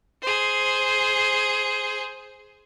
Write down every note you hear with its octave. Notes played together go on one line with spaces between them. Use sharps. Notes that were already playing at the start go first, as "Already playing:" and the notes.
G#4 C5